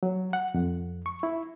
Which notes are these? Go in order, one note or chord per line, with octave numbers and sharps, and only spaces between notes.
F#3
F#5
F2
C#6
E4